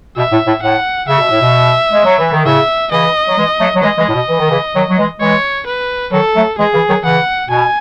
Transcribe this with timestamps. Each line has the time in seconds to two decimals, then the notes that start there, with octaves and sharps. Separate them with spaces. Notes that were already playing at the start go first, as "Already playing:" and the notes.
0.17 B2 E5
0.31 A2
0.47 A2
0.62 A2 F#5
1.08 C#3 E5
1.19 B2
1.30 A2
1.41 B2
1.92 G#3
2.05 F#3
2.18 E3
2.32 D#3
2.45 A2 C#3 E5
2.91 C#3 E3 D#5
3.28 F#3
3.37 E3 G#3
3.60 F#3 A3
3.75 F#3
3.82 E3 G#3 D#5
3.98 E3 G#3
4.09 A2
4.13 B2
4.29 E3
4.39 D#3
4.50 C#3 E3
4.75 D#3 F#3
4.90 F#3
4.98 E3 G#3
5.20 E3 G#3 C#5
5.66 B4
6.12 D#3 F#3 A4
6.35 F#3 A3
6.58 E3 G#3 G#4
6.73 C#3 E3
6.89 D#3 F#3
7.04 C#3 E3 F#5
7.49 B2 G#5